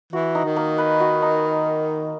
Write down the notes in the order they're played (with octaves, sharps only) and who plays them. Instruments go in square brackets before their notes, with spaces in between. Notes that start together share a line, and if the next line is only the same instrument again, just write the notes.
[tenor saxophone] E3 [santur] F#4
[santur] D#4
[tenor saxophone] D#3
[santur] A#3
B4
F#4
D#4